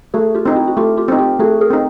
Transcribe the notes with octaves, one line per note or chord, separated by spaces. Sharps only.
A3 F#4 G#4
F4 G4
C4 D#4
E4 F#4
F#4
A3 F4 G4
F4 G4
C4 D#4
F4 G4
A3 F#4 G#4
G#4 A#4
C4 D#4